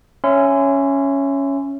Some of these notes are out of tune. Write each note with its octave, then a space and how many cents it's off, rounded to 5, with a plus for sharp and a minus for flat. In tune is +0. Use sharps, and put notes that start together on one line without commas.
C#4 +0 E5 +15 C6 -40